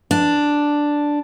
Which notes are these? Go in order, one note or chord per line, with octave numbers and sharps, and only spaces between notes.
D4